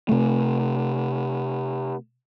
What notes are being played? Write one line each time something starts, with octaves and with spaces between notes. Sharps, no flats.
C3 A3